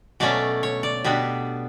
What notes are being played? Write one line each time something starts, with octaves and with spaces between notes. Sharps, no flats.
B2 F#3 A3 C#4 D5
C#5
D5
B2 G3 B3 D4